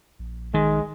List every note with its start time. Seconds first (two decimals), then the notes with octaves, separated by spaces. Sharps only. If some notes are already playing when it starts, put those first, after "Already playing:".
0.19 A#1
0.54 D#3 G#3